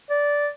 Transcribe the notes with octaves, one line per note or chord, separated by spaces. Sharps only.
D5